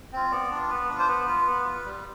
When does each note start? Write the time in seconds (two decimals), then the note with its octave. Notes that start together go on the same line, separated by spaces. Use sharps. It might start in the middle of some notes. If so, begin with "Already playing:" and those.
0.13 C4 F4
0.31 B3 D5
0.51 D4 F4
0.70 B3 B4
0.89 D4 F4
0.99 C5
1.08 B3 B4
1.28 F4
1.47 B3
1.65 F4
1.85 G3